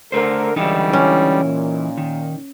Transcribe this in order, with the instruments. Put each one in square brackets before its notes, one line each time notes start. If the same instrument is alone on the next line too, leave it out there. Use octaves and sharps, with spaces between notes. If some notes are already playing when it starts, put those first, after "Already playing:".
[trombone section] D3 A#4 [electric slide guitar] A3 C5
[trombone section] C#2 D3 G3 [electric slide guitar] E3 D#4 E4
[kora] C#4
[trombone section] A#2
[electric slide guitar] D#3